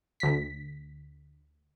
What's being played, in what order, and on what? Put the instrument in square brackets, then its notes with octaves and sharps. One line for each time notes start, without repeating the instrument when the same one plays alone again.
[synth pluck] D2 B6